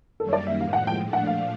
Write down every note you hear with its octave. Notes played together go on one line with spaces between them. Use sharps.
F#2 D#3 G3 A#3 A4
C#5
D5
E5
A2 F3 G#3 F5
F#5
G5
A#2 F3 A3 D4
F#5
F5